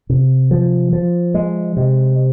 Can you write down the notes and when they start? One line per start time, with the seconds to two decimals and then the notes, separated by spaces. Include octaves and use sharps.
0.10 C3
0.51 F3
0.93 F3
1.34 G#3
1.77 C3